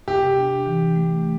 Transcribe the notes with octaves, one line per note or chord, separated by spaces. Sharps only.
C3 G4
D4
E3
A3